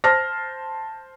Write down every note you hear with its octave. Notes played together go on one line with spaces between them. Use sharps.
C5 A5 F6 A#6